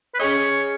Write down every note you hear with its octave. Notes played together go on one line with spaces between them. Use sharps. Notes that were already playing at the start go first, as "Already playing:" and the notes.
B4
C#4 G#4 C#5 D#5